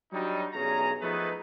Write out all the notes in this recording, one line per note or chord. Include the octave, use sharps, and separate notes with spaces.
F#3 G3 D4 D#4
B1 G2 E3 C#4 G#4 A#5
F3 A3 B3 D#4 G#4 B4